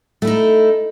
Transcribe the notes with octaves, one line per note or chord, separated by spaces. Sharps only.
A3 D#4 E4